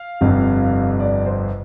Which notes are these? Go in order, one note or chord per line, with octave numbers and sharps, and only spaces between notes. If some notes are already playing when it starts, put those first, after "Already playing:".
Already playing: F5
G1 F2 C3
D5
C5